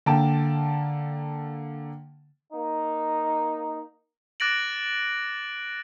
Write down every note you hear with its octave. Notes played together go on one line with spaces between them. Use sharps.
D3 A#3 G5 A5
A#3 D#4
D6 F#6 A6 A#6 D7 F#7